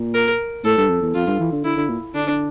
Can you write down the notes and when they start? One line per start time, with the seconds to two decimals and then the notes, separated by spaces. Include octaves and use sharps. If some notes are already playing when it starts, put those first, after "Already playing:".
Already playing: A#2
0.15 A#4
0.64 A2 A4
0.77 G2
0.90 F2
1.02 E2
1.14 F2 F4
1.27 G2
1.40 E3
1.52 D3
1.64 D3 E4
1.77 D3
1.89 A#2
2.14 D3 D4